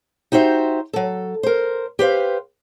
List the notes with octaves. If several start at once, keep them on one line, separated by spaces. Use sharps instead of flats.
D#4 F#4 G4 C5 E5
F#3 A4
A#4 C5
G4 B4 C5 F5